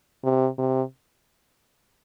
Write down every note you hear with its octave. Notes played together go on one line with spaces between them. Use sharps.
C3
C3